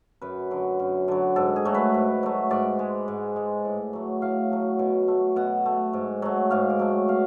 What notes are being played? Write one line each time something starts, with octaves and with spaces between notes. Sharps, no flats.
F#2 B4
D3 F#3
F#2
D3 F#3
G#2 A4
G#4
F#3 A3
B4
G#2
F#3 A3
G#2 D5
G#3
G#2
G#3
A2
F#3 A3
A2 F5
F#3 A3
B2
A3
B2 F#5
A3
G#2
F#3 A3
G#2 F5
D5
F#3 A3
B2 F5